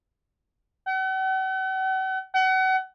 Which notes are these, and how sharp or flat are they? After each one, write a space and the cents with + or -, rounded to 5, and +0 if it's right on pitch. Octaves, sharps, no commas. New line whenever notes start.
F#5 +45
F#5 +30